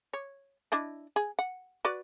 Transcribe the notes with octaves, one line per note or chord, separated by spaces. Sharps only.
C#5
D4 E4 D#5
G#4
F#5
F#4 B4 D5